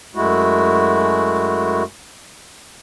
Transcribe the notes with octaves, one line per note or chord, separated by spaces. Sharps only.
F#2 G#3 A3 E4 F#4